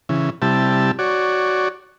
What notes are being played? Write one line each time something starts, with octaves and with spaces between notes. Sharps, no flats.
C#3 E3
C3 G3 E4 A5
F#4 C#5 D5